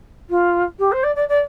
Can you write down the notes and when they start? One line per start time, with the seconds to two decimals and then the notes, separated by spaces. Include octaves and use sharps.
0.30 F4
0.79 G4
0.92 C5
1.03 D5
1.15 D5
1.28 D5